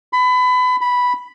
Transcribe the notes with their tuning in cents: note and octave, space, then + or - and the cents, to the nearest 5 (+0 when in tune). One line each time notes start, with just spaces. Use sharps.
B5 +25
B5 -5